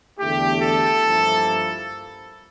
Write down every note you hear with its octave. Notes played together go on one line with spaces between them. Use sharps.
E2 D3 A3 E4 G4
A4
G2 F3 A#3 E4